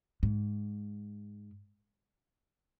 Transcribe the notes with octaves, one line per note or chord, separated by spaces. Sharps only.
G#2